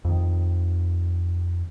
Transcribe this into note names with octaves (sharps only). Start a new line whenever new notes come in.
F2 D#3